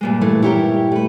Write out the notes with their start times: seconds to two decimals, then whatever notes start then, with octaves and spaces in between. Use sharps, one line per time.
0.01 G2 A#2 G#3
0.21 E3 A3
0.42 E4 G4 A#4 C#5 G5
0.92 A3 B4